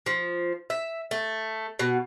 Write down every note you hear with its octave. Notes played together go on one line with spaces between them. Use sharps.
F3
E5
A3
B2